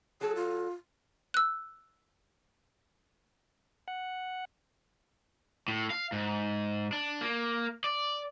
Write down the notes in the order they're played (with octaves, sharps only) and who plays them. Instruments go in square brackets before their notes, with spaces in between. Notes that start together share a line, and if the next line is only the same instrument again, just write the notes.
[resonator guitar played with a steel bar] F#3 A4 [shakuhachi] G#4
[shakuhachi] F4
[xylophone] E6 F#6
[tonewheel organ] F#5
[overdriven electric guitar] A2
F5
G#2
D4
A#3
D5